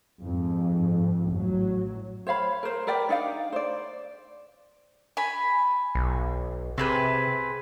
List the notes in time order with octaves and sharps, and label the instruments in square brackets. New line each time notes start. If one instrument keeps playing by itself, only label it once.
[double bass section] F2 G#2
A1 F#3
[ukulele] C5 C#5 F5 B5
A#4 C5
A#4 B4 D5 G5
D4 D#4 D5 F5
C5 D5
[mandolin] G#5 B5
[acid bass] B1
[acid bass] C3 [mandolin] C4 G#4 B4